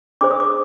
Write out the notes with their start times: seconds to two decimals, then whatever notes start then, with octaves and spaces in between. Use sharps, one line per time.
0.21 D4 G#4 C5 D6
0.31 D#6
0.40 D6